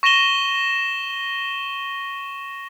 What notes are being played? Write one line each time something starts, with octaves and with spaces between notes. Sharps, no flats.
C#6 A#6 D#7 E7 G7